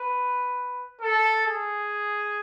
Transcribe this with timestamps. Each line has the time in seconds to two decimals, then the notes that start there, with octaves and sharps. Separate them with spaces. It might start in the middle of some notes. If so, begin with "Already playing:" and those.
Already playing: B4
1.01 A4
1.47 G#4